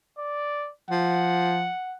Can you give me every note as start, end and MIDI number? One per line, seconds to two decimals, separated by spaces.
0.18 0.70 74
0.90 1.70 53
0.90 1.97 78